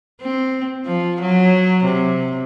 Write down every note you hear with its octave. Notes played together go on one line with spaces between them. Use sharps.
C4
F3
F#3
C3